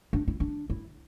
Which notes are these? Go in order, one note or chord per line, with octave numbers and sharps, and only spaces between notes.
D4
E4
D4
E4